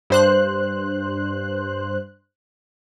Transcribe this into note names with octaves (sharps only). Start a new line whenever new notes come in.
G2 C5 F#6